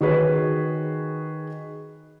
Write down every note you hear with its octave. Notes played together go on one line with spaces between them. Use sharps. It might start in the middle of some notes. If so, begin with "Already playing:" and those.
D#3 F#4 G#4 B4 C#5